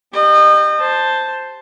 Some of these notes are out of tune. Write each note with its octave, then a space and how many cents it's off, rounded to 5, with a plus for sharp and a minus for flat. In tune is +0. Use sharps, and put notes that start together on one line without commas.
G4 +0 D#5 -35
C5 +0 A5 +0